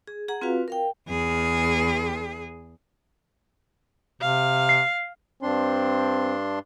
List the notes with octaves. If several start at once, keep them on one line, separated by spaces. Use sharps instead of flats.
G#4
G#4 F#5 A#5
C4 F4 F#4 B4 F5
A#4 F5 G5
E2 G#4
C3 F5
C7
G2 C4 D4 C6